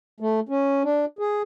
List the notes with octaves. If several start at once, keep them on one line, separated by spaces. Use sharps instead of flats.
A3
C#4
D4
G#4